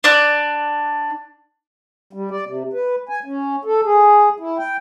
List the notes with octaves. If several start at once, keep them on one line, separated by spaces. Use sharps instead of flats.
D4 D5 F#6
G3
D5
C3
B4
G#5
C#4
A4
G#4
E4
G5